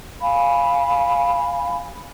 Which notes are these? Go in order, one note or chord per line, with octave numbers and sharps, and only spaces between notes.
F5 G#5 B5